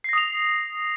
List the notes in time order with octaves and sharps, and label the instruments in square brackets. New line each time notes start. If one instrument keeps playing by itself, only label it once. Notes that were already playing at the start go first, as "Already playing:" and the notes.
[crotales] C7
A#6
D#6
F7